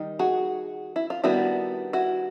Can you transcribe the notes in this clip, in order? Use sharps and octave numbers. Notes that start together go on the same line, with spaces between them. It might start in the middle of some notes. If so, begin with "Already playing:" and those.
Already playing: D#3 G3 D#4
F#4 G#4
E4
F4
D#3 G3 B3 D4 E4 F#4
E4 F#4